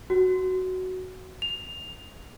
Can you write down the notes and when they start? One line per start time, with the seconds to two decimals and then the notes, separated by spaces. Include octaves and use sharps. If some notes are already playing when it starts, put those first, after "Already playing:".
0.10 F#4
1.42 F7